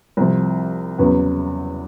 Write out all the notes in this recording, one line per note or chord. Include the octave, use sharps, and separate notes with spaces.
C2 C3 F3
E2 C#3 F#3 B3